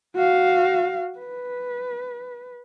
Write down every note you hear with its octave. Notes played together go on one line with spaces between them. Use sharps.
F#4 F5
B4